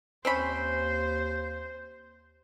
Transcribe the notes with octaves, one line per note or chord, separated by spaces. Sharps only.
D#2 C4 C#4 C5 B5